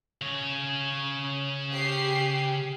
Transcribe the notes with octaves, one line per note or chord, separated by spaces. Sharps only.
C#3 C#5
G4 C7